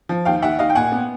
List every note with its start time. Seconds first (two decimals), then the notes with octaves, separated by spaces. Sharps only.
0.09 F3
0.25 D#2 F5 G5
0.42 D#2 E5 F#5
0.59 D#2 D#5 F5
0.70 G5
0.75 A#2 F#5 G#5
0.92 B3